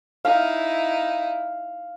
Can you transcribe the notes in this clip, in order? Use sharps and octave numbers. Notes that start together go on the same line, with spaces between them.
D#4 E4 F5